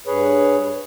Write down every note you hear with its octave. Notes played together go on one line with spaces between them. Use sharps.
G2 G#4 B4 C#5